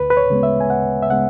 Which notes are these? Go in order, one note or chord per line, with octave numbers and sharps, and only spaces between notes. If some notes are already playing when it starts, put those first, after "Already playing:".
Already playing: D2 B4
B4
C#5
C#3 G#3 B3
E5
G#5
D2 F#5
E5
C#3 G#3 B3 F#5